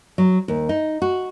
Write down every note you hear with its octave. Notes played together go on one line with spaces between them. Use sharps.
F#3
D#2
D#4
F#4